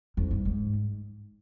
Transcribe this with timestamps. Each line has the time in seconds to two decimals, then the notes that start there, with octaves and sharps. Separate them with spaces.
0.17 F2
0.31 G2
0.45 G#2